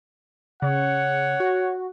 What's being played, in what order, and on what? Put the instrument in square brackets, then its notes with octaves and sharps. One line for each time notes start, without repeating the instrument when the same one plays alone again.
[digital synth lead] C#3 [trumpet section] C#5 F#5
[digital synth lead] F#4